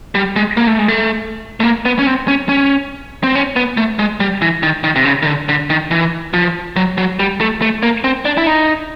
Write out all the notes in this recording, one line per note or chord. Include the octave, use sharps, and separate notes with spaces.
G3
G#3
A#3
A3
G#3
A3
A3
A#3
B3
C#4
C4
C#4
C#4
C4
C#4
B3
A3
G#3
G3
E3
D#3
D#3
C3
C#3
D#3
D3
D3
D#3
E3
F3
F#3
F#3
G3
A3
A3
A#3
C4
D4
E4
D#4